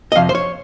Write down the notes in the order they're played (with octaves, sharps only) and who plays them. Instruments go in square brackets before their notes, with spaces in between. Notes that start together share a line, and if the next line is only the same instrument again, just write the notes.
[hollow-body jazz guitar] D#5
F2 C3 F3 F5
C5
C#5